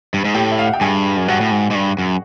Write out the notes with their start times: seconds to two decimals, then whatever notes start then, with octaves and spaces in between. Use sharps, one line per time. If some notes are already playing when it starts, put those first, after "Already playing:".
0.14 G2
0.25 G#2
0.34 A2 G4 G5
0.51 E5
0.59 F5
0.66 F#5
0.73 G5
0.81 G2 G#4 G#5
1.17 F#2
1.28 G2 F#4 F#5
1.41 A2
1.51 G#2
1.71 G#2
1.75 G2
1.99 F#2